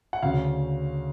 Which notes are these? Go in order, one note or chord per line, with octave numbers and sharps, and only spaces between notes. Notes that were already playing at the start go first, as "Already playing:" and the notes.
F#5
D2 C#3 F5